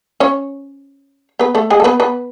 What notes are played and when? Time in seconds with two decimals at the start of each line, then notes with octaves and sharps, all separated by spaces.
0.20 C#4 C#5
1.39 B3 B4
1.55 A3 A4
1.70 G#3 G#4
1.80 A4
1.84 B3 B4
2.00 B3 B4